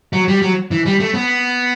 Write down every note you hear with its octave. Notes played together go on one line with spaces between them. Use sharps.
F#3
G3
F#3
E3
G3
A3
B3